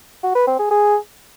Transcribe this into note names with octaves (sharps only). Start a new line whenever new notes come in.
F#4
B4
C4
G#4
G#4